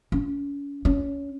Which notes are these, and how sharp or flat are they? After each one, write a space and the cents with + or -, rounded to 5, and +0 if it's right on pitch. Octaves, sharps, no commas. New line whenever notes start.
C#4 +35
C#4 +20